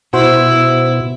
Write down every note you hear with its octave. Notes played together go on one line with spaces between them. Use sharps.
B2 E4 F#4 C5